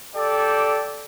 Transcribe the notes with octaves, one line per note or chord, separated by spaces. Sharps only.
G4 A4 D5 G5